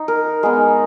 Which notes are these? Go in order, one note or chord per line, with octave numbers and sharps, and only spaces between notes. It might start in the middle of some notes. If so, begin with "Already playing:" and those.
Already playing: D#4
A#4
G#3 B3 D#4